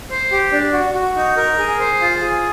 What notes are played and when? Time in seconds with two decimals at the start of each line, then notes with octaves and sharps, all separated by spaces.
0.10 C5
0.32 G4
0.52 D4
0.73 F#4
0.94 F#4
1.16 D#4
1.37 A#4
1.58 G#4
1.80 C5
2.01 F4
2.21 G#4